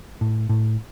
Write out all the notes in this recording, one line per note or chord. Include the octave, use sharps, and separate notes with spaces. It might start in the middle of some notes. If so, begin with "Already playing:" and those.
A2
A2